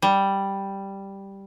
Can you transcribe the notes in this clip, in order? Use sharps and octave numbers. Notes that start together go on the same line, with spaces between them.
G3